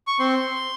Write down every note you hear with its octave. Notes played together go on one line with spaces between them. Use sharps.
C#6
C4 C6